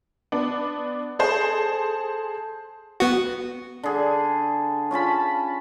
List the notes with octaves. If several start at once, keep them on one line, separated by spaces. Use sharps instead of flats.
B3 D4
G#4 A4 C5
B3 F#4
D3 G#4
C#4 F4 A5 B5